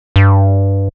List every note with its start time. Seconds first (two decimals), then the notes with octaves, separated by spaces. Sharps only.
0.16 G2